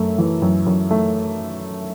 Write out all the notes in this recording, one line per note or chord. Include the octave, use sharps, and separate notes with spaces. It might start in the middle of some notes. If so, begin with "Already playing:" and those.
Already playing: F#2 A3 E5
E3
F#2
F#2
A3